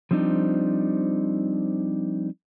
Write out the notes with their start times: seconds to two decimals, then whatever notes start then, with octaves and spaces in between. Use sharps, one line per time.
0.11 F3 G3 C4 D4 D#4